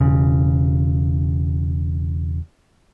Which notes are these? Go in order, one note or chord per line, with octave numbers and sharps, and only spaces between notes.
E1 C#3